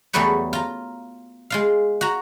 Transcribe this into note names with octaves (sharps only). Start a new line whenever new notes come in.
E2 F#3 G3 A3 B4 C#5
F4 A#5
G#3 F4 F5
F#4 A#5